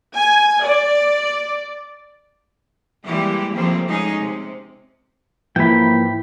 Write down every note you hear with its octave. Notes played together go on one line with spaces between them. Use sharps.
G#5
D5
E3 G3 G#3 A#3 E4 G4
C#3 F3 G3 A3 A#3 C4
G#3 C#4 D#4 G#4
C3
G#2 E3 F3 A#3 E4 G5 B5